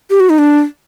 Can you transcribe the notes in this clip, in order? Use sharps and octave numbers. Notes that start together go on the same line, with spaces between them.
G4
F#4
D#4
D4